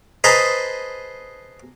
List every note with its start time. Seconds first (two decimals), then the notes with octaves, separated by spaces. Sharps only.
0.24 G#4 B4 C5 D#5 A5 A#5